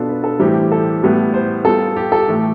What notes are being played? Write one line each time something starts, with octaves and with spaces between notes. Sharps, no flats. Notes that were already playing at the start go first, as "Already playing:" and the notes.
Already playing: B2 B3 D4 F4 A4
B4
A4
A2 E3 G3 C4 G4
A4
A2 G3 B3
C5
G3 B3 F4 A4
G4
A4
A2 E3 A3 G4